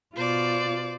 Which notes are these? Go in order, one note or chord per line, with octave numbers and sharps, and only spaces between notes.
B2 F4 C5 D5